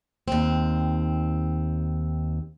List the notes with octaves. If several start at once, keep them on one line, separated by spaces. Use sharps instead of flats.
D#2 C4